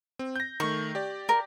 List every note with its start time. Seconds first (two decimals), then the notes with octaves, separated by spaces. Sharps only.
0.19 C4
0.36 G6 A#6
0.60 D#3 A3 C#6
0.95 G4 D5
1.29 A#4